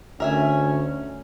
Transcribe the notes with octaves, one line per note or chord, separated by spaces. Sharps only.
D2 C#4 A#4 E5 G#5